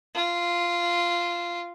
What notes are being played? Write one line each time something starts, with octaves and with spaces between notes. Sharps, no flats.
F4